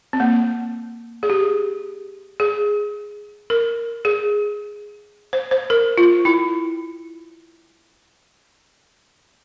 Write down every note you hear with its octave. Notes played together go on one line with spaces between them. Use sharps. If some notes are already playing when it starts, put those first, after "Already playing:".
C4
A#3
G#4
G4
G#4
A#4
G#4
C5
C5
A#4
F4
E4